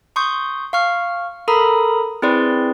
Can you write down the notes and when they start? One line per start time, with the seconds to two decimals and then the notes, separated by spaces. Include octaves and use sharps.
0.16 C6 C#6 D#6 G6
0.73 F5 C#6 F6
1.48 A4 A#4 A#5 B5 D#6
2.22 C4 E4 G#4 B4 D5 C6